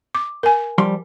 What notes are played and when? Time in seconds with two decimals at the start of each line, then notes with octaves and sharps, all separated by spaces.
0.15 D6
0.43 A#4 G#5
0.78 F3 G3 C6